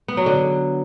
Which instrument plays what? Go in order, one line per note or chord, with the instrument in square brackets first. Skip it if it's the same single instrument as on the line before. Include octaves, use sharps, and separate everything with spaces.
[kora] B3
F#3
D3